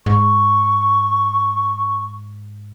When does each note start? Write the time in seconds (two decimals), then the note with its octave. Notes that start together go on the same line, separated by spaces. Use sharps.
0.06 G#2 C#6